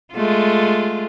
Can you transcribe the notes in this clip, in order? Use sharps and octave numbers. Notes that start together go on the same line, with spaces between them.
G#3 A3 F4